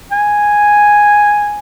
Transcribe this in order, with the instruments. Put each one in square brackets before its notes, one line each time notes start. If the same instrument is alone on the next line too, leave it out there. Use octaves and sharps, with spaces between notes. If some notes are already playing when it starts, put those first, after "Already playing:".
[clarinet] G#5